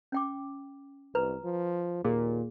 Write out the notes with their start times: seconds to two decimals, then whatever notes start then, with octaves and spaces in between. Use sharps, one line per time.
0.12 C#4 G5 D6
1.15 C2 B4 A#5
1.44 F3
2.04 D#2 A#2 G#4